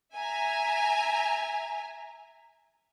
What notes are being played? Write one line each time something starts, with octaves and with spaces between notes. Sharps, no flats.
E5 G#5 A#5